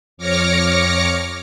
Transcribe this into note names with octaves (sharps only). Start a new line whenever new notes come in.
F2 C#5 D6 F6 A#6 C#7